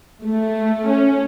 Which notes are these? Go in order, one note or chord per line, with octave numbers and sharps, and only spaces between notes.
A3
C#4